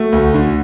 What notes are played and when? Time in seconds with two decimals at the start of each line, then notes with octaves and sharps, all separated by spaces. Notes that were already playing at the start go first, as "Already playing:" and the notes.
Already playing: A3 F#4
0.12 D2
0.34 D3